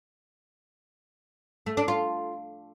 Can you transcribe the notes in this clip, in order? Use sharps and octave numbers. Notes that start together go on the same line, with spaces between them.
A3
D4
F4